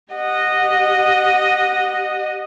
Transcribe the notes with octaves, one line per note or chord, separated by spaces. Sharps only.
G4 D#5 F#5